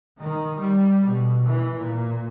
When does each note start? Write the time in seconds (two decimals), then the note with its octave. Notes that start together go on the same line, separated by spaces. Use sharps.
0.19 D#3
0.59 G3
1.05 B2
1.46 E3
1.78 A#2